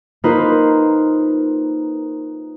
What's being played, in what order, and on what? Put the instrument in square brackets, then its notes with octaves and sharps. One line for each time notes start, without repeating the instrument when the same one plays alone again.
[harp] A#3 D#4 F4 B4 C5